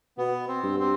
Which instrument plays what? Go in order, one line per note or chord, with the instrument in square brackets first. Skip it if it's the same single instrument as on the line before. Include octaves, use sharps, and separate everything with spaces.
[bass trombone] B2 [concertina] B3
[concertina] C4
[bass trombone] G2
[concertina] C4